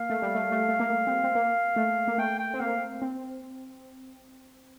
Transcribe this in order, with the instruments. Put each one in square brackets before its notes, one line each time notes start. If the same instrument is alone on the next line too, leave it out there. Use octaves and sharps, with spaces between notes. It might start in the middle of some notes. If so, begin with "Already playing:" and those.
Already playing: [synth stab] A#3 [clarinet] F5
[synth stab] A3
G3
A3
A3
A3
A#3
C4
C4
A#3
A3
A#3
[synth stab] A3 [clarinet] G5
[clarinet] G5
[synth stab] C4
[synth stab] A#3 [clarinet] F5
[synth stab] C4